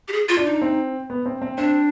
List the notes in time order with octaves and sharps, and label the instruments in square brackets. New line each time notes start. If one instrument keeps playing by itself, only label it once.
[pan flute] G4
G#4
F4
[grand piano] D4
[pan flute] D#4
[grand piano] C4
B3
C4
C4
[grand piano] C4 [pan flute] D4